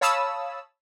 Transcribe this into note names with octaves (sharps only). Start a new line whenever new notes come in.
C#5 F5 A5 B5 D#6 E6